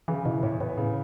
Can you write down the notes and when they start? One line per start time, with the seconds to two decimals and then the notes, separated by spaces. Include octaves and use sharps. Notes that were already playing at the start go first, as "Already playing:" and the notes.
0.08 C#3 E3
0.26 B2 E3
0.43 E2 A2
0.60 A2 B3
0.77 C#3